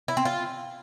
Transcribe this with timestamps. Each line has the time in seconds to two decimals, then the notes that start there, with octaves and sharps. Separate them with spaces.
0.08 E4
0.17 C4
0.25 F4